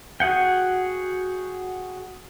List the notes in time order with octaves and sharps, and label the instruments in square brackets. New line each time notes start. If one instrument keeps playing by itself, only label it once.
[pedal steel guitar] F#4 G#4 F#5 G5